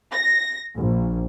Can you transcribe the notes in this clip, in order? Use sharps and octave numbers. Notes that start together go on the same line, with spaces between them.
A#6
A#1